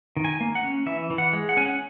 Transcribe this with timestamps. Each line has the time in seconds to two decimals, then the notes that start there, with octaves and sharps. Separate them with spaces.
0.17 D#3
0.25 G#5
0.41 A#3
0.55 F#5
0.63 C#4
0.86 E3 E5
1.10 E3
1.18 F#5
1.33 G#3
1.49 F#5
1.57 C#4 G#5
1.66 F#5